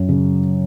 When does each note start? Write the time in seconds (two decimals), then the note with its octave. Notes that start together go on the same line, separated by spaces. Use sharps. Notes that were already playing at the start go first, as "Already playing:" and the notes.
Already playing: F#2
0.09 C#3